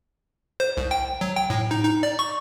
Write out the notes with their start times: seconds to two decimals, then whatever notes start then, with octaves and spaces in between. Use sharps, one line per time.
0.60 C5
0.77 C2
0.91 G5
1.21 F#3
1.36 G5
1.50 A2
1.71 D#4
1.84 D#4
2.03 D5
2.19 C#6